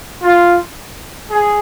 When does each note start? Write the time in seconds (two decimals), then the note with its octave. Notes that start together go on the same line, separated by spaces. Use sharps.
0.22 F4
1.30 G#4